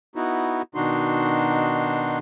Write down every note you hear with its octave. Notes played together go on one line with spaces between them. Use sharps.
B3 D#4 E4 F#4
B2 D#3 D4 D#4 F#4 C6